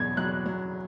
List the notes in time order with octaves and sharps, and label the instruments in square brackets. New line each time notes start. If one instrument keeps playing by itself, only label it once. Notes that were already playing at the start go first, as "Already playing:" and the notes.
Already playing: [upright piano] E2 B2 F#3 [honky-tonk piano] G#6
[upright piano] F#3 [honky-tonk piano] F#6
[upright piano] F#3